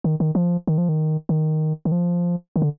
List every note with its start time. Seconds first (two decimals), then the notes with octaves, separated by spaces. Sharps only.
0.04 D#3
0.20 D#3
0.35 F3
0.67 D#3
0.78 F3
0.89 D#3
1.29 D#3
1.85 D#3
1.92 F3
2.56 D#3
2.62 D3